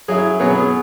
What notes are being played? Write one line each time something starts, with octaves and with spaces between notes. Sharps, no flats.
F#3 E4 G#4
B2 F#3 B3 G#4
G#4